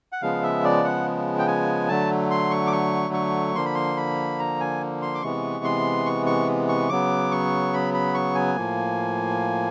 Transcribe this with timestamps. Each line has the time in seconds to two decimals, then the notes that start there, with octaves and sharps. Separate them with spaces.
0.12 F#5
0.22 C#3 F3 G#3 B3 F5
0.43 E5
0.64 D5
0.85 F#5
1.39 G5
1.47 G#5
1.89 D3 F#3 A3 A5
2.31 C6
2.51 C#6
2.67 D6
2.73 C#6
3.14 C#6
3.55 D3 F3 A#3 C6
3.65 B5
3.75 C6
3.97 B5
4.39 A#5
4.60 G#5
5.02 C6
5.15 D6
5.22 C3 E3 G#3 B3 C#6
5.64 C6
6.06 C#6
6.26 C#6
6.68 C#6
6.89 C#3 F#3 B3 D6
7.31 C#6
7.73 B5
7.94 B5
8.14 C#6
8.35 G#5
8.56 A2 F3 A#3